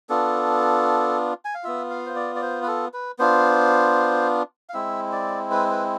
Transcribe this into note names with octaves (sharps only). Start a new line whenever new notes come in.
B3 D4 F4 A4
G#5
F5
B3 F4 E5
F5
C5
D5
D5
C5
B4
A4
B4
B3 D4 F4 C5
F5
G#3 C4 E4 E5
D5
B4
B4